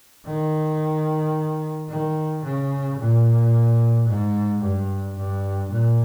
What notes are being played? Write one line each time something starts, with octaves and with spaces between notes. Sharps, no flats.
D#3
D#3
C#3
A#2
G#2
G2
G2
A#2